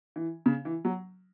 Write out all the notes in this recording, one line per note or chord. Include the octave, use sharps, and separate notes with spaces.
E3
C#3
E3
F#3